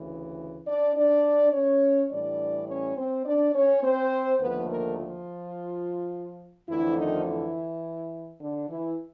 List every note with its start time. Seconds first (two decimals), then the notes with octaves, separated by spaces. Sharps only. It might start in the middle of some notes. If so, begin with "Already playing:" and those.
Already playing: D2 C#3 E3
0.67 D4 D5
0.96 D4 D5
1.53 C#4 C#5
2.10 A2 E3 G3 D4 D5
2.67 C#4 C#5
2.96 C4 C5
3.25 D4 D5
3.54 C#4 C#5
3.82 C4 C5
4.39 D#2 D3 F3 A3 B3 B4
4.68 A#3 A#4
4.97 F3 F4
6.68 F2 D3 E3 F3 A3 E4
6.97 D#3 D#4
7.26 E3 E4
8.40 D3 D4
8.69 E3 E4